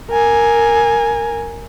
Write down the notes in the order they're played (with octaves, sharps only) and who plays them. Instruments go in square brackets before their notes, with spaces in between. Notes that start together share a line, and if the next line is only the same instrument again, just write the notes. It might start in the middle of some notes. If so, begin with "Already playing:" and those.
[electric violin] A#4 G#5